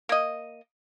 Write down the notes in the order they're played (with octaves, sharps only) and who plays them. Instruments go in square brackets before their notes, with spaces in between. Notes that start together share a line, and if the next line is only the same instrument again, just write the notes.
[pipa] A#3 D#5